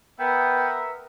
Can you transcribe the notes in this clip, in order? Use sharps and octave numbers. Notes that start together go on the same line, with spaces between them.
B3 A#4 E5 G5